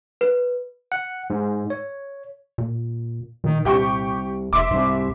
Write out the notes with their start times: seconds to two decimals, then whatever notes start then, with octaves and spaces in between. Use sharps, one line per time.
0.21 B4
0.92 F#5
1.30 G#2
1.70 C#5
2.58 A#2
3.44 A#2 D#3
3.65 C2 G4 G5 C#6
4.53 F1 E5 C6 D6
4.71 C2 G#2